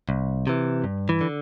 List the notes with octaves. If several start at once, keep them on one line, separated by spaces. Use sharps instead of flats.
C2
C3 E3
G2
E3
D3